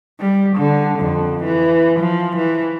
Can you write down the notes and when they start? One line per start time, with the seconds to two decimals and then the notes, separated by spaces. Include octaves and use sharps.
0.20 G3
0.57 D3
1.00 F2
1.44 E3
2.00 F3
2.37 E3